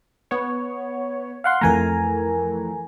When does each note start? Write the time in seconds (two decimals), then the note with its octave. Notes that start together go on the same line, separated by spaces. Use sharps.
0.31 B3 C#5
1.44 F5 F#5 C6
1.61 F2 E3 A3 A#4 G#5 A#5